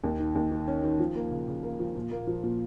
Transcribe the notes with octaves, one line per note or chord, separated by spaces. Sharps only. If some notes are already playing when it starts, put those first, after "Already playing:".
D#2
D#3
D#2
D#3
C#4
D#3
F3
A#3
C#3
C#3
A#3
F3
A#2
A#3
F3
A#2